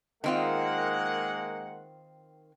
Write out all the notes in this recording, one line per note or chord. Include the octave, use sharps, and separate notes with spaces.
D#3 G#3 A#3 C4 F4 F#5